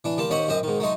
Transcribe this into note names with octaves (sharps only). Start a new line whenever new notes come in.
E3 D4
G3 A#3 A5 C6
D#2 C#4 C5 D#5 F#5
F#2 C4 C5 D#5
G#2 D#3
F#3 A3 D#4 C6